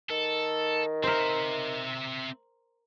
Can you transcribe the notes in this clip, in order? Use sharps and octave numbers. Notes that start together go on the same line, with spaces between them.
D#3 A4
C4 A#4 C5 E5